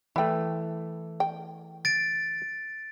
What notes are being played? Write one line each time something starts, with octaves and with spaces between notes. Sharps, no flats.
E3 A3 E4 G5
G5
A6 D7